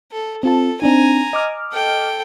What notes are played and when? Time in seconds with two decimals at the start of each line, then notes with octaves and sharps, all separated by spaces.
0.12 A4
0.43 C4 F4 A4 A5
0.82 C4 D4 D#4 G#5 A#5
1.33 D#5 D6 F6
1.72 A4 G5